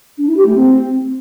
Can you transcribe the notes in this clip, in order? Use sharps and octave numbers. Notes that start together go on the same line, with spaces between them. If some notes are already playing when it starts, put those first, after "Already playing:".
D4
E4
G4
A3
C4